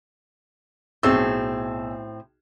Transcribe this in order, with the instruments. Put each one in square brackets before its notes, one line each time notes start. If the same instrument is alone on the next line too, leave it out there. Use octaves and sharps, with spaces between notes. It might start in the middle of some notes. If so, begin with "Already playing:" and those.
[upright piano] B1 G#4 E6 [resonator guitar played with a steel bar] A2 C4